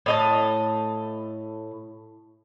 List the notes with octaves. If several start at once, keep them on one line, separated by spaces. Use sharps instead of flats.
A2 D#5 A5